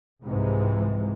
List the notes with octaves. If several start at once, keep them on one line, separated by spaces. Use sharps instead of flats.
C2 G#2 C3 E3 F3 G#3